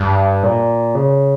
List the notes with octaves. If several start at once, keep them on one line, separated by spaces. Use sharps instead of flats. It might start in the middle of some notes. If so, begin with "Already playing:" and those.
Already playing: G2
A#2
C#3